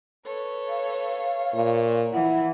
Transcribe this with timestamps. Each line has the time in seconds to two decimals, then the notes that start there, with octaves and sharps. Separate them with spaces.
0.25 A4 B4 C#5
0.69 F5
1.54 A#2 C#5
2.13 E3 E4 F#5